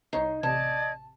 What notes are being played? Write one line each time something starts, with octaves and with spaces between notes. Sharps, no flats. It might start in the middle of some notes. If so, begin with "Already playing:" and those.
C2 D#4 C#5 C7
A1 C3 D5 D#5 A5 G#6